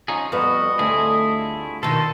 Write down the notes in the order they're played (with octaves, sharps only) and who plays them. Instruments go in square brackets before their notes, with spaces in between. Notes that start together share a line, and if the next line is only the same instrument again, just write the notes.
[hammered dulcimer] F3 [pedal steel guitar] C#4 D#4 G#4
[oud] F2 B3 [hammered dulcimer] G3 F4 [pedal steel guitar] F#4 [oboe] D#5
[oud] D2 [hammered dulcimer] D3 C4 [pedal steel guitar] A3 E4 G#4
[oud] B2 D#3 [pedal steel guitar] A4 [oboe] C6